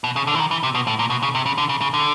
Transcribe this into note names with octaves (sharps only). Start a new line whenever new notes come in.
B2
C#3
D3
E3
D#3
E3
C3
B2
A2
A#2
B2
C#3
C3
C#3
D3
C#3
C#3
D3